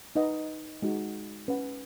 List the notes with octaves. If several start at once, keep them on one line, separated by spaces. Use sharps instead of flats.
D#4 B4 D#5 F#5
G#3 D#4 F#4
C#4 B4 F#5